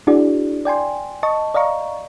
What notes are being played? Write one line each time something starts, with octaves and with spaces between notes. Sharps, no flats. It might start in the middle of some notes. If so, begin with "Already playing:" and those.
D4 E4 F#4 G#4 D5
D5 G5 G#5 C6
D#5 A5 C#6
D5 D#5 F5 A#5 C#6